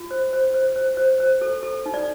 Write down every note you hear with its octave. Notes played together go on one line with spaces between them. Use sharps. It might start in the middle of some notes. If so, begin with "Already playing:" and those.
Already playing: F4
C5
C5
C5
C5
C5
C5
A4
A4
D#4
D5